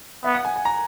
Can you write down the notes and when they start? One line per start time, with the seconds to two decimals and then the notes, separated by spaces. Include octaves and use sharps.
0.24 B3 E5
0.34 F#5
0.45 G#5
0.56 G#5
0.65 A#5